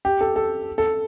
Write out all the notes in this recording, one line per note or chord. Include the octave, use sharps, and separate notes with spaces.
G4
A4
A4
A4